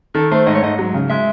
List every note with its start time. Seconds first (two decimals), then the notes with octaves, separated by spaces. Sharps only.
0.15 D#3 A4
0.32 A3 C5
0.47 G#2 D#5
0.55 C#5
0.63 G#2 D#5
0.79 F#3
0.94 C#3
1.10 G#3 E5